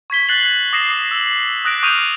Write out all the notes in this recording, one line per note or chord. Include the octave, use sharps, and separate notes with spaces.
C#6 G#6 B6 G7
F#6 A6 C7 F#7
D6 D#6 A#6 C7 E7
E6 F#7
D#6 F#6 A#6 D7
C#6 D#6 F6 G6 D#7 F7